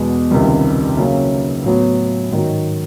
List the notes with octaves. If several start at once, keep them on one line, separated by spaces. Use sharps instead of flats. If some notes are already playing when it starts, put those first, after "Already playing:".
Already playing: E2 B2 G#3
C#2 C3 D#3 G3
C#3 F#3 A#3
A2 F#3 B3
G#2 D#3 F#3